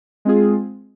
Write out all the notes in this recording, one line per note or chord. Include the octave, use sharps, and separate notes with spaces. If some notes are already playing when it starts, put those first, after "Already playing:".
G#3 C4 F4 G#4